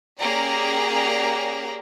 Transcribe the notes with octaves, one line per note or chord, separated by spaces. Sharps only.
A#3 C#4 G4 G#4 D5 A#5